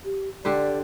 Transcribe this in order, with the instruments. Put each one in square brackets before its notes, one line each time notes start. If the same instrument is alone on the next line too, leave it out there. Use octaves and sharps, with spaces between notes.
[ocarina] G4
[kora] D3 G4 C5 [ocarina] D5